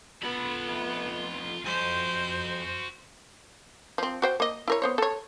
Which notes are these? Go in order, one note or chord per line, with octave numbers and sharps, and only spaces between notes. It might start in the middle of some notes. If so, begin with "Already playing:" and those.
B3 F4 A4 B5
F2 A3
F2 F#4 C5 G#5
F3 C4
F#4 C5 G5
A#3 D#5
E4 A#4 C#5
B3 C5 C#5
A4 C#5